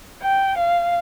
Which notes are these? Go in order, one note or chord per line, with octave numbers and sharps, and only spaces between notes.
G5
F5